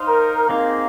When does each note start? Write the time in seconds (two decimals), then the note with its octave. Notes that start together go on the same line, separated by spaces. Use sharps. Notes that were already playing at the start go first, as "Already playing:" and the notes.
Already playing: D#4 C5 F5
0.08 A#4
0.49 A#3 C4 D#4 G#4 F5